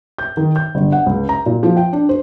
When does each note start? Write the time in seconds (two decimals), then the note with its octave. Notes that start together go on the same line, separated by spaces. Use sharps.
0.18 G6
0.37 D#3
0.56 G6
0.75 G1
0.92 F#5
1.06 C#2
1.29 A#5
1.46 A#2
1.63 F3
1.77 G5
1.93 D4
2.09 C5